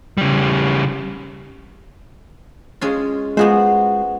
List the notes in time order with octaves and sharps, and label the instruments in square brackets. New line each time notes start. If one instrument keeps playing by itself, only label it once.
[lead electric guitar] C#3 G3
[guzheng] G#3 C#4 F4
[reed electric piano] G#3 F4 G#4 [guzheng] B3 F#4 C5